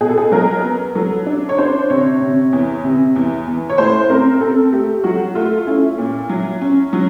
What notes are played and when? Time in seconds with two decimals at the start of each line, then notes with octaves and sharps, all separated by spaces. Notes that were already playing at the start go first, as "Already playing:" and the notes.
0.01 B2 G#4
0.09 A4
0.18 G#4
0.32 F#3 A#4
0.64 B3
0.95 F#3 A4
1.26 D4
1.49 C#5
1.58 D4 C5
1.90 C3 C#5
2.21 C3
2.52 E2
2.84 C3
3.16 E2
3.47 E2
3.69 C#5
3.78 A2 C5
4.10 C4 A#4
4.41 C4 A4
4.73 A3 G4
4.97 G4
5.04 F#3 F#4
5.35 A3 F4
5.67 C#4 E4
5.98 A#2
6.29 F#3
6.61 C#4
6.93 F#3